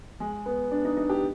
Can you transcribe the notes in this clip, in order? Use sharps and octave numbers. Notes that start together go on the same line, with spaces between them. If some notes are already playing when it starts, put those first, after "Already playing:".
G#3
B3
D4
D#4
D#4
G4